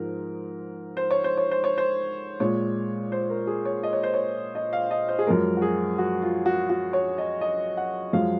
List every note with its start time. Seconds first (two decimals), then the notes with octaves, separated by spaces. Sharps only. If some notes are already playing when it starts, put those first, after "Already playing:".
Already playing: G#2 F3 G#3 A#4
0.97 C5
1.11 C#5
1.24 C5
1.37 C#5
1.51 C5
1.64 C#5
1.78 C5
2.40 A#2 G#3 C#5
3.12 C5
3.30 A#4
3.47 G#4
3.65 C#5
3.83 D#5
3.93 C#5
4.03 C5
4.14 C#5
4.55 D#5
4.73 F5
4.91 D#5
5.08 C5
5.19 G#4
5.27 F#2 F3 G#3 A#4
5.57 F#4
5.62 G#4
5.98 F#4
6.22 F4
6.46 F#4
6.70 F#4
6.93 C#5
7.18 D#5
7.41 D#5
7.77 F#5
8.13 F#2 F3 G#3 F5